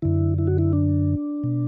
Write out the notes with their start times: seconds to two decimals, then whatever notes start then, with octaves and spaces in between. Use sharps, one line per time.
0.02 F#2 D3 E4
0.38 E4
0.47 F#4
0.58 E4
0.73 D4
1.44 B2